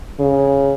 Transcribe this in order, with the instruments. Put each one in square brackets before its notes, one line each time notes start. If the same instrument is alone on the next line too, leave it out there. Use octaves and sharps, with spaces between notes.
[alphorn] C#3